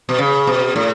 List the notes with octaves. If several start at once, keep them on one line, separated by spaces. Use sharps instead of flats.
B2
C#3
B2
A2